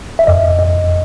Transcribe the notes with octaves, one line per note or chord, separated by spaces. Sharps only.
E5
F2 D#5
F2 D#5